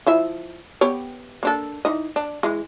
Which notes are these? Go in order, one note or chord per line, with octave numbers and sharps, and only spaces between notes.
F3 E4 E5
B3 G4 C#5
A#3 D4 A4
E3 D#4 D#5
D4
E3 G#3